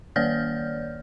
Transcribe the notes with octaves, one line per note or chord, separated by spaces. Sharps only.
D#3 A#3 C#5 D5 F6 G6